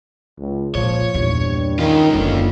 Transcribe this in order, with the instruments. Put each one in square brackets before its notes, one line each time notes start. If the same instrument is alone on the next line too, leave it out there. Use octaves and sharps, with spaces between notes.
[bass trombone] C#2
[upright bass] A#2 [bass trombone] F3 [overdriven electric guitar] C#5
[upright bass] E2 A#2 [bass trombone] G2
[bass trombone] D#3 [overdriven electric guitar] C#4 F4
[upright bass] F#1 A#3 [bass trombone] D2